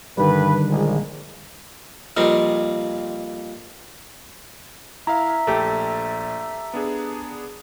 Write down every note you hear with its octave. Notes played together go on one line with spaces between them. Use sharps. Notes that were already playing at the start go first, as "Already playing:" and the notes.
G2 D3 D#3 G3 B4
A#1 G#3
F2 A#2 G3 C4 D#4
E4 E5 F5 A#5
A#1 A3 G4
B3 D4 G#4